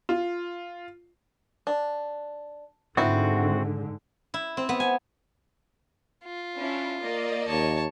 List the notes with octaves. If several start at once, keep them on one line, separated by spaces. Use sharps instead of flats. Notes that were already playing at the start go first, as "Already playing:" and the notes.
F4
D4
G#2 D3 B3 C4 E4 F#4
E4
C4
B3
G#5
F4
C#4 D4 E4
A#3 D5 D#5
D#2 C#5 A5